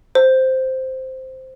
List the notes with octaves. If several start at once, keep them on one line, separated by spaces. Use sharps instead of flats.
C5